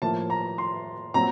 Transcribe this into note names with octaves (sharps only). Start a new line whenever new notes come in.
A2 F3 A#3 A5
A#5
C6
A#2 F#3 C4 A#5